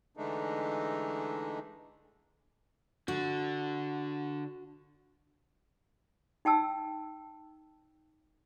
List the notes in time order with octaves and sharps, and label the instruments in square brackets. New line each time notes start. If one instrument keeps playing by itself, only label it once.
[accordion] D3 E3 G#3 A3 D4 D#4
[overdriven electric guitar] D3 [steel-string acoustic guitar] F#4
[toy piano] D#4 G5 A5 E6